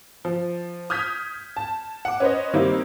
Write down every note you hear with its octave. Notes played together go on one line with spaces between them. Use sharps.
F3
D#6 F6 G6 G#6 B6
A5
F#5 D6
C#4 B4 C5 D#5
D#3 G3 A#3 C4 D#4 E4